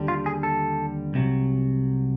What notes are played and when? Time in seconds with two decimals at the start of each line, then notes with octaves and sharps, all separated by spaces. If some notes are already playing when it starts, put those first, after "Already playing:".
Already playing: D#2 D3 G3
0.08 F4
0.26 G#4
0.43 A4
1.14 C2 C3 D#3 F#3